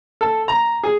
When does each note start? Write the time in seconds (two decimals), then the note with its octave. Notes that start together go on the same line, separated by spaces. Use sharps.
0.21 A4
0.48 A#5
0.84 G#4